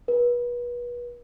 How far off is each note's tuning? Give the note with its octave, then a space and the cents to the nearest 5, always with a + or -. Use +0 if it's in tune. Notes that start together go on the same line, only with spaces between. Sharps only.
B4 -35